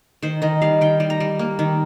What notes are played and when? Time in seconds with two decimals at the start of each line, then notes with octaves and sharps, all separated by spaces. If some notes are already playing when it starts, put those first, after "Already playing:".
0.22 D#3 C5
0.42 D#3 D#5
0.62 G3 F5
0.81 D#3 G5
1.00 G3
1.10 A#5
1.20 G3
1.39 A#3
1.59 D#3